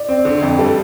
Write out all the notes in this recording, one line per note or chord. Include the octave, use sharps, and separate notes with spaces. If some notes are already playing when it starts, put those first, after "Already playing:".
Already playing: D5
C4
D3
F2
G3 A4